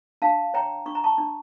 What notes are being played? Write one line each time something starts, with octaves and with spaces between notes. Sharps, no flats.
D4 F5 A5
C#5 G5 A#5
D4 C#6
A#5
A5 C#6
D4